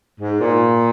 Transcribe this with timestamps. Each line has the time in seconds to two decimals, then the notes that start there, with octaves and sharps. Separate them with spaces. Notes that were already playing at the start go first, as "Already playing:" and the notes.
0.20 G#2
0.40 A#2